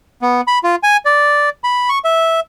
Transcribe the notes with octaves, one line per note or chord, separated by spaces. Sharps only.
B3
B5
F4
G#5
D5
B5
C#6
E5